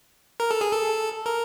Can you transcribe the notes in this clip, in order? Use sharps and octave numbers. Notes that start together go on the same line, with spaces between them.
A#4
A4
G#4
A4
A#4